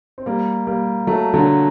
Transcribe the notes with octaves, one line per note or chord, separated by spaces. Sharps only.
C4
G3 A#3
G3 A#3
F#3 A3
D3 F#3